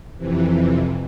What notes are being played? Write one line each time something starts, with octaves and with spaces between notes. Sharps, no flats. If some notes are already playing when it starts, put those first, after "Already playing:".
F2 C3 E3